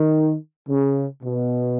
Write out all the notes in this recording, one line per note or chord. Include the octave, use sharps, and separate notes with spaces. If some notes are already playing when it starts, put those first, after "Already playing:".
Already playing: D#3
C#3
B2